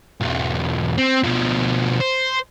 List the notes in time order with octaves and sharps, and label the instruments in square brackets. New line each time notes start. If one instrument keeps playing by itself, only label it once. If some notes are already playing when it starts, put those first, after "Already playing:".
[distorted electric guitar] B1 E2
C4
B2 F3
C5